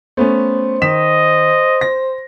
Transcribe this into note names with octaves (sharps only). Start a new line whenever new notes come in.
A3 B3 C#4 C5
D#3 D#5 B6 E7
A#6